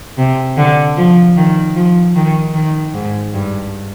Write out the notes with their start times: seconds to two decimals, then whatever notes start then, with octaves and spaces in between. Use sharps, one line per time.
0.18 C3
0.57 D3
0.97 F3
1.37 D#3
1.75 F3
2.15 D#3
2.54 D#3
2.94 G#2
3.34 G2